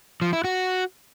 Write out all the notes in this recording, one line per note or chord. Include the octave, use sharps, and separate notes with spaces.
F3
E4
F#4